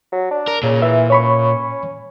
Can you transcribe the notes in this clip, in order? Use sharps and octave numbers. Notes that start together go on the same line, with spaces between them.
F#3
D4
A#4
A#2 C#3
E3 E5
C#4 C#5 B5 C#6